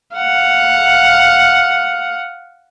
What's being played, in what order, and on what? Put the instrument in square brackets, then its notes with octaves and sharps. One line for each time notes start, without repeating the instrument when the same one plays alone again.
[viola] F5 F#5